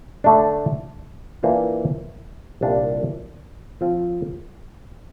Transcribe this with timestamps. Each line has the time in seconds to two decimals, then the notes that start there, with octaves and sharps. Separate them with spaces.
0.24 D3 A3 D4
1.43 E3 A#3 D4 F4 C5
2.61 C2 A#2 G3 D4 F4
3.81 F3 C4 F4